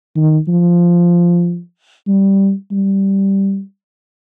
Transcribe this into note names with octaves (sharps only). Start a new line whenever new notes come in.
D#3
F3
G3
G3